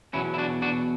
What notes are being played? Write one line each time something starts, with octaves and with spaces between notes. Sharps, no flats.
E2 B2 F#3 C#4 E4
E4
D4 F#4
D4 F#4